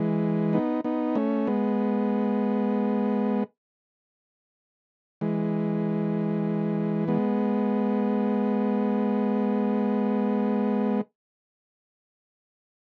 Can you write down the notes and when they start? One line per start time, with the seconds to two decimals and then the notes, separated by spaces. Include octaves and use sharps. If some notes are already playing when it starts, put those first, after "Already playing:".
Already playing: E3 G#3
0.53 B3 D#4
0.84 B3 D#4
1.15 A3 C#4
1.47 G#3 B3
5.21 E3 G#3
7.08 G#3 B3